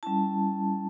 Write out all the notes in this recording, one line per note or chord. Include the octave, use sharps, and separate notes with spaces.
G3 C#4 E4 A5